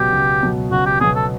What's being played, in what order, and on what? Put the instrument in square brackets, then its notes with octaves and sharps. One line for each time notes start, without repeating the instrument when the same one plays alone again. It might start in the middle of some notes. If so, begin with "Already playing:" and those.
Already playing: [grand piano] C#2 B2 F#3 B3 [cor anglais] G4
[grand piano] C#2
B2 F#3 B3
[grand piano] C#2 [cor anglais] F#4
[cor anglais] G4
[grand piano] B2 F#3 B3 [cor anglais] G#4
[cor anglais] A4